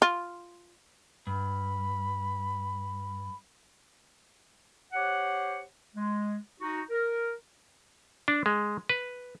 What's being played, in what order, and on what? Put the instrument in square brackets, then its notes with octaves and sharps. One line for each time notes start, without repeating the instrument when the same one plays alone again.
[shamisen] F4
[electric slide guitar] G2 [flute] B5
[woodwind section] G4 C5 C#5 F#5
G#3
D#4 F#4
A#4
[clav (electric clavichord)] D4
G#3
B4